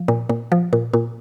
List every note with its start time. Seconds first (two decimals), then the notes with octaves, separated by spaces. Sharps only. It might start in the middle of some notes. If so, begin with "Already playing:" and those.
Already playing: F3
0.08 A#2
0.29 A#2
0.52 F3
0.73 A#2
0.94 A#2